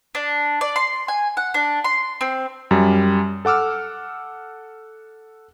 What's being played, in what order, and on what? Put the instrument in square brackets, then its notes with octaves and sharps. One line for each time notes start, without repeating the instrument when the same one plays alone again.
[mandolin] D4
D5
C6
G#5
F#5
D4
C6
C4
[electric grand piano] F#2 G3
A4 F#5 D6 E6 F6